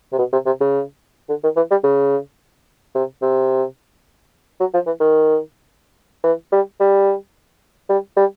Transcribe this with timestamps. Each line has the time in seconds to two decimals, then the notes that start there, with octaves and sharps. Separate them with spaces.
0.12 C3
0.18 B2
0.33 C3
0.46 C3
0.61 C#3
1.29 D3
1.43 D#3
1.56 E3
1.71 G3
1.84 C#3
2.95 C3
3.22 C3
4.60 F#3
4.74 F3
4.86 E3
5.00 D#3
6.24 E3
6.52 G3
6.80 G3
7.89 G3
8.17 G3